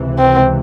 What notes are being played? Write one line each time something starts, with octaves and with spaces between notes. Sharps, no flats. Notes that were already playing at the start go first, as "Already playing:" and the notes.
Already playing: C#2 C3 E3
C4